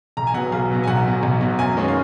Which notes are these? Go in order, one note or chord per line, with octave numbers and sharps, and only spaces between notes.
B1 A#5
G#5
B2 F#3 B3 F#5
B1 F5
B2 F#3 B3
G#5
B1 F#5
B2 F#3 B3
B1
B2 F#3 B3
F#2 G#5
D#3 G#3 C#4
F5